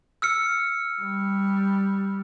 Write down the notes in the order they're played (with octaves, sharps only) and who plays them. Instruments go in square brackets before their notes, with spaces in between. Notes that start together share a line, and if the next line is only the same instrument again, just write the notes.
[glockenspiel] E6 F6 C#7
[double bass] G3